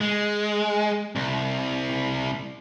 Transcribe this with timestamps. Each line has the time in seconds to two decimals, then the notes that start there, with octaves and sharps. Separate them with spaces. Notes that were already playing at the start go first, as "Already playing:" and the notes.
0.01 G#3
1.16 C2